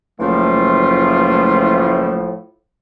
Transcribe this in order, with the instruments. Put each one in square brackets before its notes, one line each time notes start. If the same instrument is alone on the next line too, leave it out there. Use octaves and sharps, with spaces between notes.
[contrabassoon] F#1 [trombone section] A2 F3 [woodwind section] E3 G3 A3 [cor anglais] F4